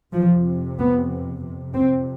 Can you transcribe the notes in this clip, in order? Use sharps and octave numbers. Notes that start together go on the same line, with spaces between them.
F2 C3 F3
B3
F2 C3
C4